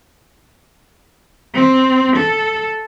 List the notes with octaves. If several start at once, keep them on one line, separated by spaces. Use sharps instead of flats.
C4
A4